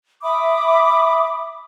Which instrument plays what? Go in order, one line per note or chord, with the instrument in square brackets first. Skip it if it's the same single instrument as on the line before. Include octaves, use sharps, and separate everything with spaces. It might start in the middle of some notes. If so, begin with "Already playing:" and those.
[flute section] E5 B5 D6 D#6